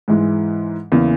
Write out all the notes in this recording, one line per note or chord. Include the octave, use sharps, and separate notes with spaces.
G#2 E3 G#3
E2 C#3 E3 A#3